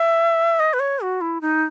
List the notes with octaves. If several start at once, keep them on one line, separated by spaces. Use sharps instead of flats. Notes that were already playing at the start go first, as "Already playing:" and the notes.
Already playing: E5
D#5
B4
C#5
F#4
E4
D#4